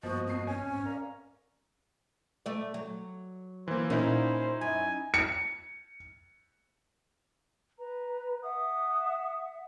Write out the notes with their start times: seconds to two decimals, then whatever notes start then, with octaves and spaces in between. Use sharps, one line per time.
0.03 G2 F3 A#3 B3 F#4 D#5
0.27 F2 F#4 C7
0.47 C#4 C#5 G#5
0.67 G#2 C4
0.86 A#4 D5 F5 A#5
2.46 A3 D5
2.74 F#3
3.68 E3 A#3 C5
3.90 A#2 C#4 D#4 E4 A#4 C5
4.61 F#2 G#5
5.14 C#7
7.79 B4 A#5
8.43 E5 F#5 D#6